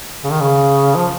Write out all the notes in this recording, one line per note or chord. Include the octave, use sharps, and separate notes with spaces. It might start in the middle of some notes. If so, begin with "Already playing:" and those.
C#3
D#3
C#3
F3